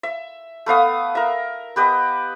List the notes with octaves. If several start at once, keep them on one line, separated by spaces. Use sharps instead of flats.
E5
A3 B3 F5 D#6
A#4 E5
B3 G4 B4 D#5